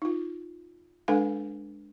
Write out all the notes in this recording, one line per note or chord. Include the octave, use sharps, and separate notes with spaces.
D#4 F4
G#3 D4 A4 B4 F5 G#5